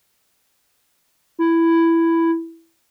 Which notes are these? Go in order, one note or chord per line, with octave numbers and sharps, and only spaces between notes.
E4